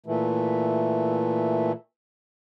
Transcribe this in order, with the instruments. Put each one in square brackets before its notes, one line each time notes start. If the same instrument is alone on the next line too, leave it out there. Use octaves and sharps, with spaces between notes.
[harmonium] A#2 E3 A3